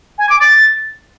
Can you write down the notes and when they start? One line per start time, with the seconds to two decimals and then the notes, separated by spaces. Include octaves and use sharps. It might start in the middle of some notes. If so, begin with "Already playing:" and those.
0.18 G#5
0.29 D6
0.40 A6